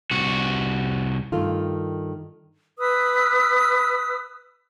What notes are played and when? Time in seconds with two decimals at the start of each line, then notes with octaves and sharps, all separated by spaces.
0.11 C2 F#4
1.32 G2 D#3 A3 F4
2.77 B4 D#6 E6